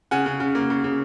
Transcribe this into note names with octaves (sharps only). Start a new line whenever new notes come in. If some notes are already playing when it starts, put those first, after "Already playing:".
C#3 F#5 G#5
C#3
C#3
A#3
C#3
C#3